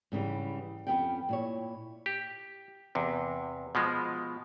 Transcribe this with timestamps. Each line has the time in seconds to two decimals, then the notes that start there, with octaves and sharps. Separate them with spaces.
0.12 G#2 C#3 E3 G3
0.87 F2 B3 C#4 B4 G5
1.29 A#2 E4 C#5
2.06 G4
2.95 E2 C3
3.75 B2 F3 G#3